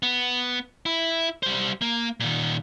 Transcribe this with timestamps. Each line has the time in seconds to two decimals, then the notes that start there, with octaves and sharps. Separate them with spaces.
0.03 B3
0.86 E4
1.43 G3 C5
1.81 A#3
2.20 A#2 D#3